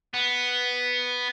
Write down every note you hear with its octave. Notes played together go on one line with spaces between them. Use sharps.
B3